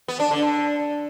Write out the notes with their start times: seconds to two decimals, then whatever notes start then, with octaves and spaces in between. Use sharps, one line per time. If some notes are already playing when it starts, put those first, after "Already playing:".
0.08 B3
0.20 D4
0.31 D3
0.42 D3